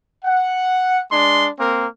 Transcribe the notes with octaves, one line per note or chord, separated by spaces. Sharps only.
F#5
G#3 D4 C6
A#3 C4 A#4